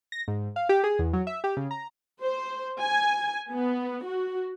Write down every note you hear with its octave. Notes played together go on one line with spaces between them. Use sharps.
A#6
G#2
F5
G4
G#4
E2
F#3
E5
G4
C#3
A#5
C5
G#5
B3
F#4